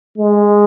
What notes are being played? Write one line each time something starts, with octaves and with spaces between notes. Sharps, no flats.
G#3